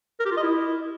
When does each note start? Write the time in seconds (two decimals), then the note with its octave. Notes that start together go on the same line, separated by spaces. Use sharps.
0.20 A#4
0.25 G4
0.31 F4
0.37 D#5
0.43 E4